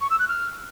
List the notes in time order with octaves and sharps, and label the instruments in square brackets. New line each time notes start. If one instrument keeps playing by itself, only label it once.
[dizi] C#6
E6
F#6
F6